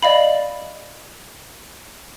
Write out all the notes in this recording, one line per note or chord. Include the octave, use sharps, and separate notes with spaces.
D5 D#5 F5 B5